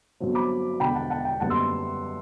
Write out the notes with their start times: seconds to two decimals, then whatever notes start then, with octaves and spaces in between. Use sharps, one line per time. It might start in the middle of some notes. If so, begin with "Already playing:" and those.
0.20 G1 G2 F#3 C4
0.35 B5 D6
0.80 E1 E2 D3 G5 B5
0.95 F#5 A5
1.10 F#5 A5
1.25 G5
1.40 F#1 F#2 D3 G3 B3 F#5 A5
1.50 C6 E6